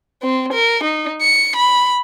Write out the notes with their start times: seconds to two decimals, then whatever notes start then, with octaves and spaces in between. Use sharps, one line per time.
0.23 C4
0.53 A#4
0.84 D#4
1.21 C#7
1.56 B5